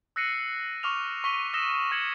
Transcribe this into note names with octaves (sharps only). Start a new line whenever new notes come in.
E6 F#6 A#6 C7 C#7 D#7
C#6 D6 F6 F7
C#6 B6 D#7 G7
D#6 E6 A#6 B6 E7 G7
C#6 G#6 C#7 E7 F#7